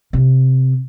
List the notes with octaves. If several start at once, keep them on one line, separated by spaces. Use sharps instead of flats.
C3